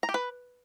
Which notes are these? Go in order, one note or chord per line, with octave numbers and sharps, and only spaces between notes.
A#5
G4
B4